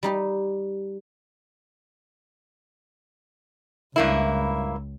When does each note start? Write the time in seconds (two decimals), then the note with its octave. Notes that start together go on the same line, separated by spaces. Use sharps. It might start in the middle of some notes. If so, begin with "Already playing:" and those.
0.03 G3 D#4 G4
3.96 C#2 G2 A#3 E4